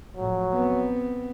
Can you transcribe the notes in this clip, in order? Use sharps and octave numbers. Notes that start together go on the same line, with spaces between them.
A2 F3 F#3
B3 C4